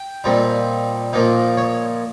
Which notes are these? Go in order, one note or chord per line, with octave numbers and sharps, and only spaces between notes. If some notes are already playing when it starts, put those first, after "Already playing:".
Already playing: G5
A#2 G3 C4 D#4
A#2 F3 A#3 D#4
C#5